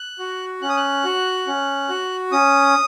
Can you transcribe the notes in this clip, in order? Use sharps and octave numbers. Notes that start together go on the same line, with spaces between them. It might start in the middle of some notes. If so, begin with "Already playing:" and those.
Already playing: F#6
F#4
C#4 F#6
D#6
F#6
F#4
C#4
F#4
C#4 D#6